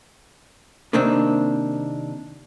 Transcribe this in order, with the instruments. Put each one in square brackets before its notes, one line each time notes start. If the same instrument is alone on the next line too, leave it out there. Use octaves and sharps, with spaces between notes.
[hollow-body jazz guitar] C3 D#3 A#3 C4 D4